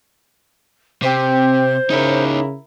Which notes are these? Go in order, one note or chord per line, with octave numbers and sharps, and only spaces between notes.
C3 C4 G4 C5
C#3 D#4 E4 A#4 C#5